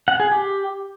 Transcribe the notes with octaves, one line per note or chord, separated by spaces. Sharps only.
F#5
G#4
G4